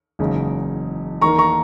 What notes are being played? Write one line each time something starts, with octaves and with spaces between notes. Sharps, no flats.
F#1 E2 C#3 G#3 D#4
E2 D#3 A#3 D#4 A#5 C#6
A#5 C#6